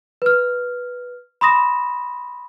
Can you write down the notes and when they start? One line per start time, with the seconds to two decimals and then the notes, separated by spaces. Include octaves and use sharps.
0.22 B4 F6
1.41 B5 C6 D#6 A#6 E7